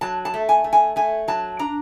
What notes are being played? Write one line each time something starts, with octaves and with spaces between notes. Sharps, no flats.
F#3 A5
A5
A3
G#5
A3
G#5
A3 G#5
F#3 A5
D4 A#5